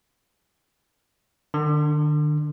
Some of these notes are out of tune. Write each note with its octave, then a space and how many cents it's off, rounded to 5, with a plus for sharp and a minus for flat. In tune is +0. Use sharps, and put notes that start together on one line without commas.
D3 +45 D4 +0